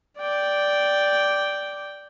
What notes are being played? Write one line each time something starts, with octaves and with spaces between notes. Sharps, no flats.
D5 G5